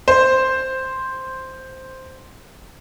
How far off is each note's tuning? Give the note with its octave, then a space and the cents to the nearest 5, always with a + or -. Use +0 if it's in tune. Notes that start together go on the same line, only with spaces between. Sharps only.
C5 +0